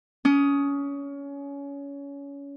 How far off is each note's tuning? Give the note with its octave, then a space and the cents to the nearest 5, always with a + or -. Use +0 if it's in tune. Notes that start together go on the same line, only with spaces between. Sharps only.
C#4 +25 D#6 +10